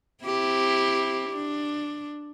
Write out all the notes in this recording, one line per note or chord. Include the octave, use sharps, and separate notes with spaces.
C4 E4 G4
D4